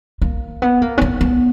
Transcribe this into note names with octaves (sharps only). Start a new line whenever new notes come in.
A#3
B3
A#3
C#4
B3
B3